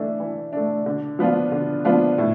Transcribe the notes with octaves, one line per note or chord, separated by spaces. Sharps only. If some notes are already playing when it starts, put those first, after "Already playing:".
Already playing: E3 A3 D4
E3
A3 D4
D3
F3 B3 D4 F4
D3
F3 B3 D4 F4
A2